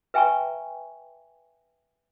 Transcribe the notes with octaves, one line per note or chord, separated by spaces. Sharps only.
B4 E5 G5 G#5 A#5 C#6